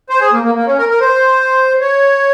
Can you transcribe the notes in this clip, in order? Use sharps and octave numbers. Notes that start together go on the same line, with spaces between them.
C5
G#4
A#3
A#3
A#3
C#4
A#4
A#4
C5
C#5